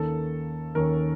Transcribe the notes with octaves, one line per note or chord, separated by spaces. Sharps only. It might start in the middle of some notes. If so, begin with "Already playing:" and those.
Already playing: D#2 D#3 A#3 C#4 A4
D#2 D#3 A#3 C#4 A#4